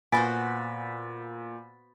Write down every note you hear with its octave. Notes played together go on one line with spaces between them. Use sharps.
A#2 B3 F#4 C5 G#5 B5 A6 B6